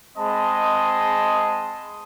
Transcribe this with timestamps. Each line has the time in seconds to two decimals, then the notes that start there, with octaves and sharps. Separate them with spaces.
0.18 G#3 C4 D#5 A5 B5 C6